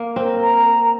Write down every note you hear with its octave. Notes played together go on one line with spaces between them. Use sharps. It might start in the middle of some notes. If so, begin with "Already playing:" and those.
Already playing: A#3
C4 A#4
A#5